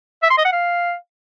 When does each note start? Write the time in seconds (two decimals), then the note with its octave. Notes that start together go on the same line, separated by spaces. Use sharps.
0.23 E5
0.30 C6
0.38 D#5
0.45 F#5
0.53 F5